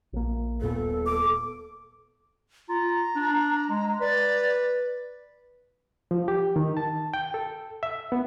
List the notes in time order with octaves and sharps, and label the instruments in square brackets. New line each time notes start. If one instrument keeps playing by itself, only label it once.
[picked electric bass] A#1 A#3
[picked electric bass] D#1 A#2 B3 [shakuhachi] A4
[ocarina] D6
[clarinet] F4 [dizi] A#5
[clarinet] D4
G#3
[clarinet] B4 [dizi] D5
[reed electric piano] F3
G4
D#3
A5
G5
A4
E5
B3